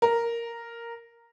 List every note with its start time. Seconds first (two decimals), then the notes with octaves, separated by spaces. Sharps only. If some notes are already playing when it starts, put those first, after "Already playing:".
0.02 A#4